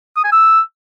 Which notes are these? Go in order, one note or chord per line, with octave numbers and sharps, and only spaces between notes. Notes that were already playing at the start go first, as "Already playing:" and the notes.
D#6
G#5
E6